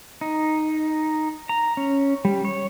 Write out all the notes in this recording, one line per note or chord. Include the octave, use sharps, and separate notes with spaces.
D#4
A#5
C#4
G3
C#5